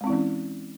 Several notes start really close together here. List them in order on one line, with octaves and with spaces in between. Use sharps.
G#3 C4 E4 E3 C#4